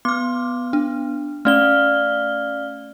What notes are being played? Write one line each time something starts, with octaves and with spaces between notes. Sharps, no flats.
B3 D6 F6
D4
A3 C#4 D5 F5 F6 G7